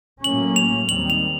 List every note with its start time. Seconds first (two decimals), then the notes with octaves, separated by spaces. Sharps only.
0.23 A2 F#3 A#3 C#4 F#7
0.56 F7
0.88 D#2 D#3 G3 C4 F#7
1.10 F7